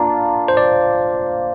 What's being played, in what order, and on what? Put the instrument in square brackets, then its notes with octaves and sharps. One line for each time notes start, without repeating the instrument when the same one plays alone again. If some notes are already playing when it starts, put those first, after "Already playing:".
Already playing: [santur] A#3 D4 F4
[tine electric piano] C5
D5